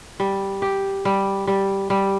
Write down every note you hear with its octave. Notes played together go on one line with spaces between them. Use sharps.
G3
G4
G3
G3
G3